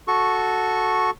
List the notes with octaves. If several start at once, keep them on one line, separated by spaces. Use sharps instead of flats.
F#4 A4 C#6